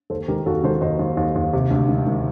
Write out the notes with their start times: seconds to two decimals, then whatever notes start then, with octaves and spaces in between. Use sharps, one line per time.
0.10 D#2 A4 C5
0.28 D#3 G4 A#4
0.46 D#2 F#4 A4
0.64 D#3 A4 C5
0.81 D#2 C5 D#5
0.99 D#2
1.17 D#2
1.36 D#2
1.53 C3
1.70 D2
1.88 D#3
2.06 D#3